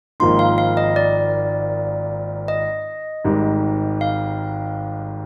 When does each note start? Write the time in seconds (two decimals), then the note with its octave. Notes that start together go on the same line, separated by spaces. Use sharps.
0.20 G#1 G#2 F3 A#3 D#4 C6
0.39 F5
0.58 F5
0.77 D#5
0.96 D5
2.48 D#5
3.24 G#1 G#2 G3
4.01 F5